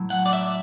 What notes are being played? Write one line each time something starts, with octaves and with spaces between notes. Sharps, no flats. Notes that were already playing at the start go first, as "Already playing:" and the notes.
Already playing: A2 F#3
F#5
D5
E5